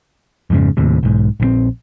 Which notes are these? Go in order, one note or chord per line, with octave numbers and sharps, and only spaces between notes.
F2 G#2 C#3
D#2 A2 C3
B1 G#2
A#1 D#3 C4